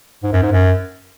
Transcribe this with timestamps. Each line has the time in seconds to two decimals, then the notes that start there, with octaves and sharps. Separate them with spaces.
0.24 G#2
0.33 F#2
0.42 G#2
0.52 F#2